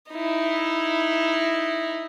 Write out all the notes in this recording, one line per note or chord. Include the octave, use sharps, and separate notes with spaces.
D#4 E4